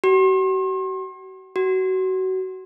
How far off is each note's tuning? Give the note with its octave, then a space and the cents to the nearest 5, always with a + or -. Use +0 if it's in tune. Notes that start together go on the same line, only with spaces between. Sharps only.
F#4 +45
F#4 +25